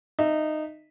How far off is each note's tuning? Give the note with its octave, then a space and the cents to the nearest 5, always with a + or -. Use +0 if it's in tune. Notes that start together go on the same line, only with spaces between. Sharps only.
D#4 -15 E5 -5